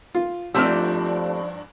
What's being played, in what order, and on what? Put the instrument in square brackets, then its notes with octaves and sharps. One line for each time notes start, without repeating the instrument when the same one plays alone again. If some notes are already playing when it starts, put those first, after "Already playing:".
[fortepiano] F4
[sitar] G2 D4 [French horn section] F3 [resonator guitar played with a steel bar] A3 C4 G4 [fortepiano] E6 F6